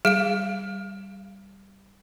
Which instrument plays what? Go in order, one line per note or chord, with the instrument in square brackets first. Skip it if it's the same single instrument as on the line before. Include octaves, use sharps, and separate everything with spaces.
[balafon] G3 [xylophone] G#4 F5 D7